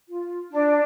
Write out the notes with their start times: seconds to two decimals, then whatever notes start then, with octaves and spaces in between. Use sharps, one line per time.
0.09 F4
0.51 D4